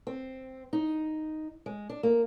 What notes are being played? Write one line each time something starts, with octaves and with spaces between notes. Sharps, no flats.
C4
D#4
G#3
D4
A#3